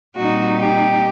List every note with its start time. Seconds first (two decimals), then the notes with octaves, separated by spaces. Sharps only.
0.16 A#2 G3 C4 D#4 F#4
0.58 G4